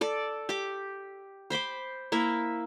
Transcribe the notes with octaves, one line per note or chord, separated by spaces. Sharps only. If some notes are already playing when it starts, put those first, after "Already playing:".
A4 D5
G4 D6
C5 B5 C6 D6
A#3 E4 E5